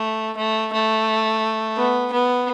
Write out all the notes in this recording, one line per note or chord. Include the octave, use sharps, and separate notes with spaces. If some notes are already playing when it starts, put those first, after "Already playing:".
Already playing: A3
A3
A3
B3
B3